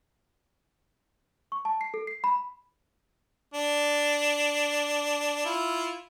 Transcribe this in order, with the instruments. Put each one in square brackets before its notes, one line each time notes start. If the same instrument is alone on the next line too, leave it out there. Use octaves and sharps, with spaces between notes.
[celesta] C#6
A5
C7
A4
C7
B5
[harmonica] D4
E4 F4